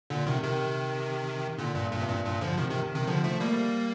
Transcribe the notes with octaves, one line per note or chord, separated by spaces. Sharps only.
A#2 D3
C3 D#3
C3 D#3
A#2 D3
G2 A#2
G2 A#2
C3
G2 A#2
G2 A#2
D3 F3
C3 D#3
C3 D#3
C3 D#3
D3 F3
F3 A3
G3 A#3